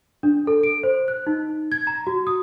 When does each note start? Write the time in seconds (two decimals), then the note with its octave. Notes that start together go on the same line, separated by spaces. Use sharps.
0.23 D4
0.47 A4
0.63 D7
0.83 C5
1.08 F#6
1.27 D#4
1.72 G#6
1.87 A#5
2.07 F#4
2.27 D#6